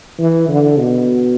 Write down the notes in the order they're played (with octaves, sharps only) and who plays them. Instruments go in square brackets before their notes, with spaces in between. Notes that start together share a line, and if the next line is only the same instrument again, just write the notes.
[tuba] E3
D3
B2